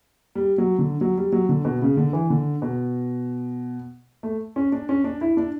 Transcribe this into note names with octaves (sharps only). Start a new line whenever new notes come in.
G3
F#3
D3
F#3
G3
F#3
D3
B2
C#3
D3
E3
D3
B2
A3
C#4
D4
C#4
D4
E4
D4